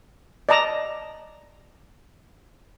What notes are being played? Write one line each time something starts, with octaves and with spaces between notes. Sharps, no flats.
D5 D#5 A5 A#5